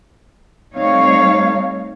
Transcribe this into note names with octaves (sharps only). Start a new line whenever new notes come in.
G3 A3 C4 D#4 C#5 F5